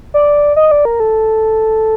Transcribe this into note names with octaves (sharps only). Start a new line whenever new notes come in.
D5
D#5
D5
A#4
A4